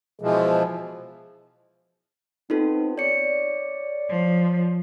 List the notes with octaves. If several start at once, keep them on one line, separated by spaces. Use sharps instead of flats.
B2 E3 F3 G#3
B3 C4 D#4 F4 A4
C#5 D5 C#7
F3